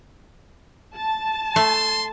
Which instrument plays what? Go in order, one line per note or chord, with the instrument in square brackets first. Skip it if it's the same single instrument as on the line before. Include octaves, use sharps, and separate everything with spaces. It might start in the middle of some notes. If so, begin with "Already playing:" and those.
[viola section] A5
[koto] A3 [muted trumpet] C6